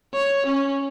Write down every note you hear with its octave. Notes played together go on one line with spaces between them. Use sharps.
C#5
C#4